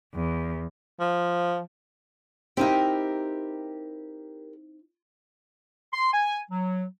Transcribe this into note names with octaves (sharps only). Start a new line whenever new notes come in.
E2
F3
C4 D#4 E4 G4 A#4
C6
G#5
F#3